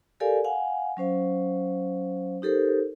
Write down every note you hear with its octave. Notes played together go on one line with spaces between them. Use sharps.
G4 A4 A#4 D5 F5 G#5
F5 F#5 G#5
F#3 C#4 C5 F5
D#4 G4 A4 A#4 C5